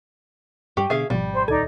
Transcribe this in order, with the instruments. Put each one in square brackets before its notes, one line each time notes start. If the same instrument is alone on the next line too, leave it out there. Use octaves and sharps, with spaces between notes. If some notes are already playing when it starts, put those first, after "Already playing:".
[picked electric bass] G2 G3 [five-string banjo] G4 [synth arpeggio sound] C#6
[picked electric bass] B2 D3 [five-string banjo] G#4 E5 F5
[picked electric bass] G#1 [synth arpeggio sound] B2 F3 [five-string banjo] G3
[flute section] C5
[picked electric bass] D#1 [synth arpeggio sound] C#2 A4 G#6 [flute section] D#4 D5